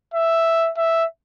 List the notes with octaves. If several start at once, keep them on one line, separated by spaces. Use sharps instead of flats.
E5
E5